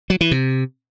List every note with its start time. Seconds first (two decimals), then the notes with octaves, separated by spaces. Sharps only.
0.10 F#3
0.21 E3
0.31 C3